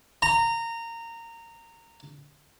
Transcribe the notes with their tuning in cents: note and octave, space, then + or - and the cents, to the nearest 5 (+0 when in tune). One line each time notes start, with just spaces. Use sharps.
A#5 -20